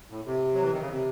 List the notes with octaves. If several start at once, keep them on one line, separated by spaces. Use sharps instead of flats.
A2
C3
F#3
E3
D#3
C#3
C3